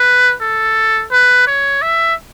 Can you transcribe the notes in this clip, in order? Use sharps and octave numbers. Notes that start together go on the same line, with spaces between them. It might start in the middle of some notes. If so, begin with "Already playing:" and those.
Already playing: B4
A4
B4
C#5
E5